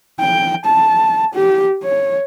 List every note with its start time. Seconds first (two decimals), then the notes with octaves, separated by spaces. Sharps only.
0.20 G5
0.66 A5
1.34 G4
1.84 C#5